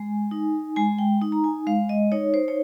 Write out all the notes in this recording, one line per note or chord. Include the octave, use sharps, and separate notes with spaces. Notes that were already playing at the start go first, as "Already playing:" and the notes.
Already playing: G#3 G#5
D#4
G#3 G#5
G5
D#4
A#5
G#5
G#3 F5
D#5
D#4 C#5
C5
C#5